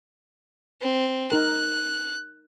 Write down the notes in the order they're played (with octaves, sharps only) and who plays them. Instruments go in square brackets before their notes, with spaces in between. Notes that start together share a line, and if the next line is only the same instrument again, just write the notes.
[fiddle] C4
[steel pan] D#4 A#4 [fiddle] F#6